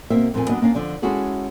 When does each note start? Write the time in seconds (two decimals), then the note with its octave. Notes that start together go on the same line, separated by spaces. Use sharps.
0.10 B2 A#3 C4 E5
0.34 F2 A#2 A3 A#3 G#5
0.49 F#3 B3 D4 D#5
0.62 A#3 C#4 D4 F5
0.75 D3 F3 D5
1.02 G#3 C#4 E4 F#4 G#4 A4